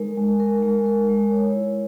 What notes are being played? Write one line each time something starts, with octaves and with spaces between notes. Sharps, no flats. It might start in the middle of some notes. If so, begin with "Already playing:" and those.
Already playing: G#3 D#4 A#4
G#3
A#4
G#3
A#4
G#3
C#5
E4